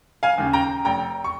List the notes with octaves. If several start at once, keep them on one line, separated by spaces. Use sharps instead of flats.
F5 G#5
D#2 C#3
G5 A#5
F1 G5 A#5
C#6